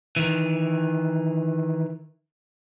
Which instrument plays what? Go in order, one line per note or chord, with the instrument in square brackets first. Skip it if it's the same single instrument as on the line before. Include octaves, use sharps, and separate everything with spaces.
[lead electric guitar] D#3 E3